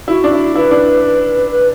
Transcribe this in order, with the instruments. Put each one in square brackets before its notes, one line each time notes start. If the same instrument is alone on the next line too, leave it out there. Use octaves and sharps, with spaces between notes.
[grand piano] E4 [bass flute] F#4
[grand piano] D4
E4
[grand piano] E4 [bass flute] B4
[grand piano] D4
[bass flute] B4